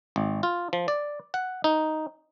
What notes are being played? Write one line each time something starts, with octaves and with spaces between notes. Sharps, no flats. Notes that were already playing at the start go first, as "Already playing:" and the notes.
G#1
F4
F3
D5
F#5
D#4